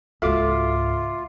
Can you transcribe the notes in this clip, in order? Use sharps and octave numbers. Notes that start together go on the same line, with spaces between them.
C#2 G#2 F4 F#4 A4 E5 F5 D6